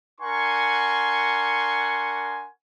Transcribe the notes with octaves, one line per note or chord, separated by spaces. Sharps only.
D4 A#4 F#5 G#5 C6 C#6